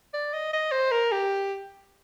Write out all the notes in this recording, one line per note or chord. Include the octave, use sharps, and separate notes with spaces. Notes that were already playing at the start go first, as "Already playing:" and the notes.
D5
D#5
D#5
C5
A#4
G4